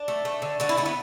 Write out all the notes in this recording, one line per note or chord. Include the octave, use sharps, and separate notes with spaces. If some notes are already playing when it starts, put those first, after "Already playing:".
Already playing: D4
A3
A3
D3
D3 F#4
E4
A3 D4
B3